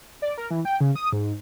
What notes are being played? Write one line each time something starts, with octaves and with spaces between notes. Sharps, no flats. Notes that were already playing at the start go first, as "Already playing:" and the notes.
D5
A#4
E3
G5
C#3
D#6
G#2